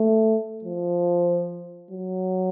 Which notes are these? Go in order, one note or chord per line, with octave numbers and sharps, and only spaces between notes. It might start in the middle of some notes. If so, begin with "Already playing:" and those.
Already playing: A3
F3
F#3